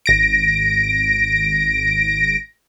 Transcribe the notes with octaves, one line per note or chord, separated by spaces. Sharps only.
G#1 A#6 D7